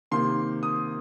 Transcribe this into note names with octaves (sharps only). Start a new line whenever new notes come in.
C3 D#3 A#3 C6
D#6